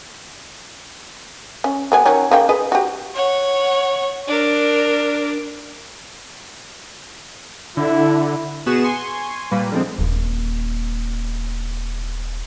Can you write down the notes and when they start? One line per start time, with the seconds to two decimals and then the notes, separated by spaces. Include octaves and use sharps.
1.64 C#4
1.92 G3 B3 G#5
2.06 D#3 F#3 C#4
2.31 C#3 A#3 G5
2.49 G#4 B4 D#5
2.72 F#4 G4
3.15 C#5 F#5
4.27 D4 A#4
7.77 D3 E4
8.66 B2 B3 F#4 G#4 B4 E7
8.84 G#5 C6 C#6
9.51 A#2 G3 A#3 B4
9.72 D3 F3 G#3 C4
9.98 D#1 A#3